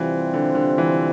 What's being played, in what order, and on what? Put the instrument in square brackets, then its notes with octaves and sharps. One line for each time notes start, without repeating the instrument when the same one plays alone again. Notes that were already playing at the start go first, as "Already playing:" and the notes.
Already playing: [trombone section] C3 G3 C4 F4 C5 [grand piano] E3
[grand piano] D3
D3
E3